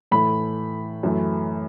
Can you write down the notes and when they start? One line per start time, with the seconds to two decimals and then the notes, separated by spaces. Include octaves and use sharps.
0.11 A2 E3 A3 B5
1.03 F#2 E3 A3